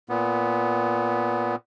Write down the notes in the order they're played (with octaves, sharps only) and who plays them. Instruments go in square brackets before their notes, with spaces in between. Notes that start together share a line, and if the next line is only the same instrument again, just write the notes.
[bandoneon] A#2 B3